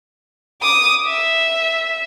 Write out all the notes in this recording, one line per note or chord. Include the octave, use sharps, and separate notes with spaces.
D6 D#6
E5